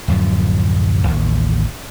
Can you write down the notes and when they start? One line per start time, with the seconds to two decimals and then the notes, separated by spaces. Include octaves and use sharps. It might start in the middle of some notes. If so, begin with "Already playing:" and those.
0.08 D1 F#2 F3
1.08 A1 D#2